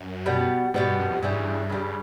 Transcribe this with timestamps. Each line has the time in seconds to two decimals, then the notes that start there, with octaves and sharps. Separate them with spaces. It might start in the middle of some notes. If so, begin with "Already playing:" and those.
Already playing: F#2
0.26 B2 G3 B3
0.74 G#2 B2 G3 B3
0.86 G2
0.99 F#2
1.10 F2
1.22 G2 C#3 E3 G3
1.31 G#2
1.40 G2
1.70 C#3 E3 G3